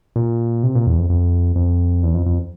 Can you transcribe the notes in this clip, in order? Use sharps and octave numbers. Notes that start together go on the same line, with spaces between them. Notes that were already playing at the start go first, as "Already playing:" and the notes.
A#2
C3
A#2
E2
F2
F2
F2
E2
F2
F2